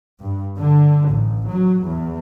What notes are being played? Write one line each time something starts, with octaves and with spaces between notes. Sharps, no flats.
G2
D3
A1
F#3
E2